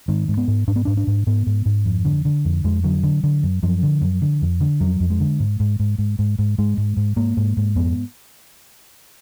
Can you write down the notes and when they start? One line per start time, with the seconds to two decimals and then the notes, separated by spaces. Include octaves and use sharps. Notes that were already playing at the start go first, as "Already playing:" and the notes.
0.08 G#2 D#3
0.28 G#2
0.37 B3
0.48 G#2
0.67 G#2 D4
0.76 B3
0.85 G#2 D4
0.97 D4
1.07 G#2
1.27 G#2 B3
1.46 G#2
1.66 G#2
1.85 F2
2.05 D3
2.25 D3
2.45 F2
2.64 F2 G#3
2.84 D3 F#3
3.03 D3
3.23 D3
3.43 F#2
3.63 F#2 F3
3.83 D3
4.02 F#2
4.22 D3
4.42 F2
4.60 D3
4.80 F2 F#3
5.00 F2
5.10 G#3
5.20 D3
5.40 G#2
5.60 G#2
5.79 G#2
5.98 G#2
6.19 G#2
6.39 G#2
6.58 G#2 G#3
6.77 G#2
6.97 G#2
7.16 G#2 A#3
7.37 G#2
7.57 G#2
7.75 F2 B3